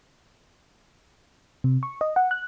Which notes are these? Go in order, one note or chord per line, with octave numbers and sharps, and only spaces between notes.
C3
C#6
D#5
F#5
F#6